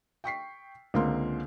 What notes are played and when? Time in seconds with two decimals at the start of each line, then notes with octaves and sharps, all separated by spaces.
0.24 G5 C#6 B6 C7
0.94 C#2 D3 A#3 C4 F4 C6